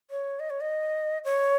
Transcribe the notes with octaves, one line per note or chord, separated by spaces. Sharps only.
C#5
D#5
C#5
D#5
C#5